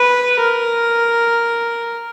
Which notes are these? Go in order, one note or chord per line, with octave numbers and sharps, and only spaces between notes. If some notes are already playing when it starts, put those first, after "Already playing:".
Already playing: B4
A#4